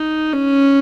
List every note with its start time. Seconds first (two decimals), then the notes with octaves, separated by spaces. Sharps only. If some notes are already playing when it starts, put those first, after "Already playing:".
Already playing: D#4
0.33 C#4